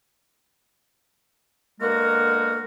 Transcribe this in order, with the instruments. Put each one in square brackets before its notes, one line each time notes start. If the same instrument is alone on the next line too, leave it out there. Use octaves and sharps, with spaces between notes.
[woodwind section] B2 D3 G#3 A#3 F#4 A#4